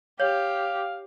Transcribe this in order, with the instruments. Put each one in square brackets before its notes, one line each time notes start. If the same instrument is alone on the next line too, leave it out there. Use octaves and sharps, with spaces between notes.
[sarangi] G4 [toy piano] C#5 [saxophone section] F5